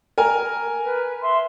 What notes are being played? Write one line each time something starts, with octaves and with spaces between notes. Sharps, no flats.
A#4 G#5
B4
E5 C6